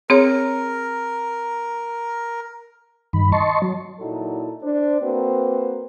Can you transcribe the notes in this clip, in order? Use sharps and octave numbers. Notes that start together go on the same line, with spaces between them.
C4 G#4 A#4 C#5
G2 D#3 B5
D#5 A5 C6 C#6
F#3
A#2 F#3 D#4 E4 A4
D4 C5
A#3 C4 F#4 B4 C5